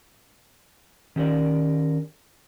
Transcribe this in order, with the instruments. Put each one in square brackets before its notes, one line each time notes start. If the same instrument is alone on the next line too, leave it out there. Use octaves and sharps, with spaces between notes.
[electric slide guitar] D#3 C#4 G4 A#4 D5